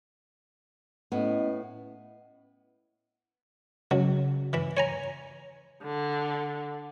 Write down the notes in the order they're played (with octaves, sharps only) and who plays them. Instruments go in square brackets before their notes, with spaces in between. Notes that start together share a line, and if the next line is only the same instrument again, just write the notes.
[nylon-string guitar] A2 B3 [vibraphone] C#4 E4 D#5
[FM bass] C#3 [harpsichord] F#3
[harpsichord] E3 E5
C#5 G#5 A#5
[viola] D3